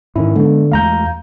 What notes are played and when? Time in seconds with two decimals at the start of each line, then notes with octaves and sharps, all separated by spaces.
0.16 G#2 D#3 C#4 E4
0.36 D3 G#3 B3
0.72 E2 G#3 A3 F5 A#5 G6